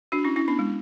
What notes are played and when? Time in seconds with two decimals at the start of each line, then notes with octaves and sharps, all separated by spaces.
0.12 D4 F#4
0.24 C#4 E4
0.36 C#4 E4
0.48 B3 D4
0.59 G#3